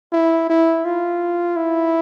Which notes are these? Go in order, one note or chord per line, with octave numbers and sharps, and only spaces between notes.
E4
E4
F4
E4